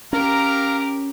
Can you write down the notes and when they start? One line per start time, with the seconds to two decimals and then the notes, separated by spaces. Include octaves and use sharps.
0.13 C#4 G4 A#4 F5 A#5